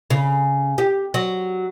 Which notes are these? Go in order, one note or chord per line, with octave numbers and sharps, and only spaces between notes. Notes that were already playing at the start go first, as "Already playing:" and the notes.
C#3
G4
F#3